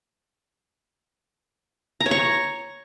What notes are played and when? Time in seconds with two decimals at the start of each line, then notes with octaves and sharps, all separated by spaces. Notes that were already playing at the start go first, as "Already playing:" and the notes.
2.00 A#5
2.06 C#5
2.11 C#6